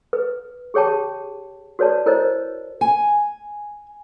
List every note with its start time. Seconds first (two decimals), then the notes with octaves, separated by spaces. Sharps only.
0.13 B4
0.74 G4 G#4 C#5 G5 A5
1.79 F#4 B4 C#5 D5 A5
2.06 E4 A#4 C5 C#5 D#5
2.81 G#5